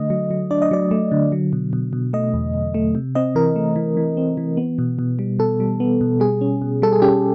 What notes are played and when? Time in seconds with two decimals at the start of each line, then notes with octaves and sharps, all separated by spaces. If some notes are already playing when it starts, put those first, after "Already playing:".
Already playing: D3 A3 D#5
0.10 F#3
0.31 F#3
0.51 D4 D5
0.62 D#5
0.71 F#3 D5
0.91 A3
1.12 D3
1.32 F#3
1.53 B2
1.73 B2
1.93 B2
2.13 A3 D#5
2.34 E2
2.54 E2
2.74 A3
2.95 C3
3.15 C4 D#5
3.35 E3 A#4
3.56 A3
3.76 E3
3.97 E3
4.17 C4
4.37 E3
4.57 B3
4.79 B2
4.99 B2
5.19 G3
5.39 B2 A4
5.60 G3
5.80 B3
6.01 B2
6.20 G3 G#4
6.41 C#4
6.62 B2
6.82 G3 A4
6.93 G#4
7.02 C#4 G4